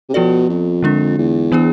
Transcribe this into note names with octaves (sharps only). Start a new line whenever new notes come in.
C3
B2 F3 B3 F4 A4 D5
F2
D3 G#3 D4 F4
E2
E3 B3 D4 G#4